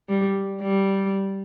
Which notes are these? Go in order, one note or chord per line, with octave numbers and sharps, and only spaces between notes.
G3
G3